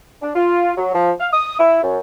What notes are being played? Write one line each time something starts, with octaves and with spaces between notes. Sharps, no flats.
D4
F4
F#3
F3
F5
D#6
E4
F#2